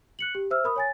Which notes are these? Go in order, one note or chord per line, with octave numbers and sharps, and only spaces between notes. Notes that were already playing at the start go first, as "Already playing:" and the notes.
F#6 C#7 F#7
G4
C5 E5 E6 F6
A#4 B5 D#6
C#5 G#5 A6